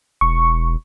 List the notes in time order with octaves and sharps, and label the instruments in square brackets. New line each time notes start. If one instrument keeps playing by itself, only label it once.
[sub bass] E1 [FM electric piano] C#6